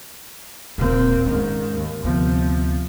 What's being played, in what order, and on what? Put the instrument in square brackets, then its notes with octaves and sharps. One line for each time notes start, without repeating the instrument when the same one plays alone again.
[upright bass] D#1 A#2 [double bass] A#3 C4
[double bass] G#2 D#3 [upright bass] G#3 C#4
[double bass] D#2
[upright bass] D2 B3 [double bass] C3 F3